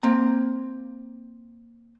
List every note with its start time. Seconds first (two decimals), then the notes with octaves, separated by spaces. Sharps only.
0.03 A#3 C4 A#5